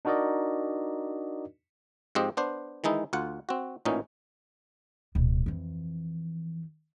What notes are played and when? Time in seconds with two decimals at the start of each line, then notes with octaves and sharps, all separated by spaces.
0.05 D4 D#4 F#4 A#4 D5 D#5
2.15 G#2 F3 C4 G4 D#5
2.37 B3 D4 C5
2.84 D#3 E3 G#3 D#4 E4
3.13 D2 F4 F#5
3.49 C4 F#4
3.85 A1 A#2 E3 C#4 D#4
5.15 D1 B2
5.46 F2 E3